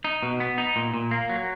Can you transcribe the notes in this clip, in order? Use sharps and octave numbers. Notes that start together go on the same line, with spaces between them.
D#4
B2
B3
D#4
A#2
A#2
A#3
F#3